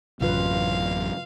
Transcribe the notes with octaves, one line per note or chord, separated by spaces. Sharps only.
A1 F#2 C#3 F4 B4 F5